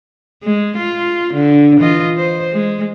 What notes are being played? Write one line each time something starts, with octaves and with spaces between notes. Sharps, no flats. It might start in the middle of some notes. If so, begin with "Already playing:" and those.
G#3
F4
D3
E3 F4 D#5
C5
G#3